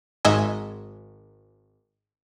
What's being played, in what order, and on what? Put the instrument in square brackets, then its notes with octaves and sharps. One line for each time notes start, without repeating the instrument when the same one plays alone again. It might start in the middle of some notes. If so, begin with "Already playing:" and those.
[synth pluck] G#1 G#2 D#5 E5 G#5